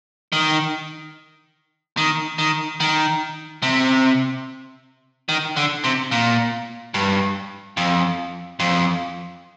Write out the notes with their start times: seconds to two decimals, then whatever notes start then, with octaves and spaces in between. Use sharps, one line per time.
0.32 D#3
1.97 D#3
2.38 D#3
2.80 D#3
3.62 C3
5.29 D#3
5.57 D3
5.84 C3
6.11 A#2
6.94 G2
7.77 F2
8.60 F2